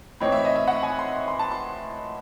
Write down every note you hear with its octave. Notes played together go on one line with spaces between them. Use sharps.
A2 E3 C4 D#4 C#5
E5
D#5
E5
F#5
G#5
C6
C6
A5
C6